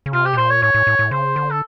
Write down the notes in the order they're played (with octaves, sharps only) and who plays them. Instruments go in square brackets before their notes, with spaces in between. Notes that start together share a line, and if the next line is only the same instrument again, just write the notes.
[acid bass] C#3
[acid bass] C3 [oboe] F4
[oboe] G4
[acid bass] B2
[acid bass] A#2 [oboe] C5
[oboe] C#5
[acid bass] A2 [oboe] C#5
[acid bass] A2
A2
A2
[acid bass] C#3 [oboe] C5
[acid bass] D3
[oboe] A4